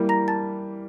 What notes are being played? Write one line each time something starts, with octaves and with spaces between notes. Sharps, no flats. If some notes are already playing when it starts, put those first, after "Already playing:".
Already playing: E3 G3 A#3
A#5 A#6
A5 A6